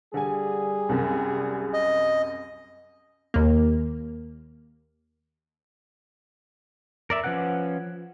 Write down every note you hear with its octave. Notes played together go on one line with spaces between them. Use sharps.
D3 G3 G#4 G#5
C2 F#2 C3
D#5
D#2 A#3
A#4 D5 E5
F3 C#4 B4 F#5 F#6